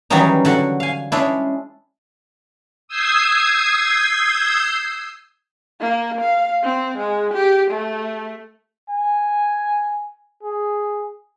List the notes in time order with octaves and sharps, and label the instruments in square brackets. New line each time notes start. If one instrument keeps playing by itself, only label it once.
[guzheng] D#3 E3 F#3 G3 C#4 D#4
D3 F#4 F#5
F5 G#5
G#3 C#4 D4 E4
[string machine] D#6 E6 G6 G#6 C7
[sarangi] A#3
F5
C4
G#3
G4
A3
[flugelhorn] G#5
G#4